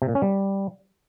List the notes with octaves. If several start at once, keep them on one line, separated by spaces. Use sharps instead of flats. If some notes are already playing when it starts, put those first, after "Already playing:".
C3
A#2
C#4
G3